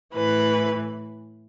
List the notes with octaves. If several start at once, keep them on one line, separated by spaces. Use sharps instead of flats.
A2 E3 B4